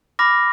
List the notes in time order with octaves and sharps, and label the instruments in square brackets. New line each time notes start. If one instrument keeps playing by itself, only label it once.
[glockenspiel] B5 D6 F6 A#6